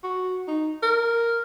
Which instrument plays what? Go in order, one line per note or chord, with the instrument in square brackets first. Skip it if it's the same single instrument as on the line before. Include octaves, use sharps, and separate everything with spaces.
[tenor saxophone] F#4
D#4
A#4